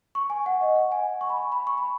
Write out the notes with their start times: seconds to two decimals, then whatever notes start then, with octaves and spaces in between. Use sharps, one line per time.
0.15 C#6
0.30 G#5
0.46 F#5
0.61 D#5
0.76 F#5
0.92 G#5
1.21 C#6
1.30 B5
1.36 G#5
1.52 B5
1.67 C#6
1.78 B5